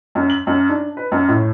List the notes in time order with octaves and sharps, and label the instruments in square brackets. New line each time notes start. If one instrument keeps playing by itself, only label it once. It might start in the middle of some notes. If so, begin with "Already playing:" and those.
[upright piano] F#2
F#7
F#2
D4
B4
F#2
A2